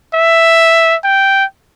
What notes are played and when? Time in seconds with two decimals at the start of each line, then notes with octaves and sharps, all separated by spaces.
0.14 E5
1.04 G5